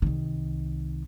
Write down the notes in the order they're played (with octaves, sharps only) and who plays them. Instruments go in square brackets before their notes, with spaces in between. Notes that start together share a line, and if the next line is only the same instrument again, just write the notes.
[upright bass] C2 D#3